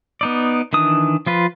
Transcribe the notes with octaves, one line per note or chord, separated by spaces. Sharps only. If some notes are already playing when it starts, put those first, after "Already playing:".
B3 D#4 D5
D#3 E3 D4 D#6
F3 F4 B4